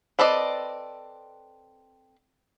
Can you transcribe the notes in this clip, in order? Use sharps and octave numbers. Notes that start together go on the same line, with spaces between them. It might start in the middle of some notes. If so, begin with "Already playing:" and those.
C4 A4 B4 D5 D#5